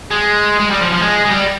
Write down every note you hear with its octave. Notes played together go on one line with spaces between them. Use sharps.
G#3
G#3
G3
F3
F3
G#3
G#3
G3